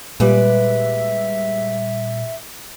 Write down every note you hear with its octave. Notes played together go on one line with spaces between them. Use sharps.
A#2 G3 G#3 B4 D5 E5